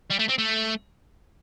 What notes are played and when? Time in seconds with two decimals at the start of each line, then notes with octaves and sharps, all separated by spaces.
0.10 G3
0.19 A3
0.29 C4
0.38 A3